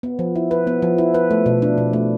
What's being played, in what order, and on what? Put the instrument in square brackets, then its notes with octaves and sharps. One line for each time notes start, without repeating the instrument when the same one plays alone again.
[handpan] B3
F3
E4
B4
B3
F3
E4
B4
A3
B2
D4
B2
A3